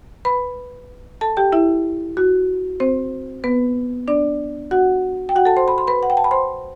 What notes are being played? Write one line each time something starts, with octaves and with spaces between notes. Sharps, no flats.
B4 B5
A4 A5
G4 G5
E4 E5
F#4
C4 C5
B3 B4
D4 D5
F#4 F#5
G5
F#4 F#5
A4 A5
C5 C6
B5
C6
B4 B5
F#5
G5
A5
B5
C5 C6